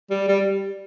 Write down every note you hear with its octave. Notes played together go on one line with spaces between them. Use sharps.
G3
G3